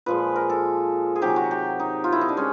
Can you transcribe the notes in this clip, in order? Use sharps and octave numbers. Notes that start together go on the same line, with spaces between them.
A#2 F3 G#3 B4
A#4
A4
G#4
C3 D#3 F#3 G4
F#4
G4
D#4
F4
E4
D#4
D4
G#3 C#4